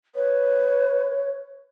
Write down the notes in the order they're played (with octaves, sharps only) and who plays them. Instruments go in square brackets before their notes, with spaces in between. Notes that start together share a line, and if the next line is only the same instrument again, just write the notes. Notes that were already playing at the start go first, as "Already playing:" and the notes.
[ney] B4 [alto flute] C#5